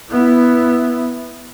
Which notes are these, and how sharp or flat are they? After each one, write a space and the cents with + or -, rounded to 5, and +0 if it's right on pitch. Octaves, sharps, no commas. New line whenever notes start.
B3 +0 E4 +0